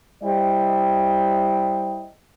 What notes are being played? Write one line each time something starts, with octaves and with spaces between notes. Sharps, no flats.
G3 E4 C5 D5 D#5 G5